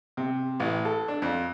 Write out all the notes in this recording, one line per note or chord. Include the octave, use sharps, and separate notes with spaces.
C3
A1
A4
D4
F2